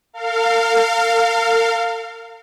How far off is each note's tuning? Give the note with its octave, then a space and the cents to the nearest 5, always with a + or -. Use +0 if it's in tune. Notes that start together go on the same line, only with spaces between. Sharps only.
A#4 -45 F5 +0